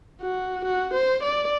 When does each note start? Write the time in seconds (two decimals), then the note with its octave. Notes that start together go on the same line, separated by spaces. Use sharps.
0.22 F#4
0.65 F#4
0.94 C5
1.23 D5